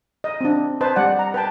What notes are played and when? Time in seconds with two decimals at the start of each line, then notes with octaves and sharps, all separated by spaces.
0.24 D#5
0.41 C4 D4
0.81 B4 C5 D#5 A5
0.96 G3 D5 F#5
1.19 A#5
1.34 B4 G5 A5